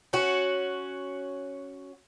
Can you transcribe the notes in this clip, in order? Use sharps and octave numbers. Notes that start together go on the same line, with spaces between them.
C#4 F#4